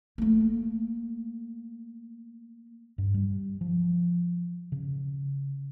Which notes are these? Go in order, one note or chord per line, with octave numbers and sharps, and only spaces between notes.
A3 A#3
G2
G3
F3
C#3